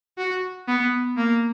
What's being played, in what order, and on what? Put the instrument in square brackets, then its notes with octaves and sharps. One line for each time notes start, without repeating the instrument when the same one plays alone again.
[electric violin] F#4
B3
A#3